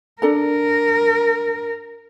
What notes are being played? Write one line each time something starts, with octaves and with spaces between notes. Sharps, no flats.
D4 A4 A#4 A#5